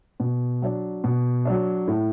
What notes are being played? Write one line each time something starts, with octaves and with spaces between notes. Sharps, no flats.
B2
F#3 D4
B2
F#3 D4
A2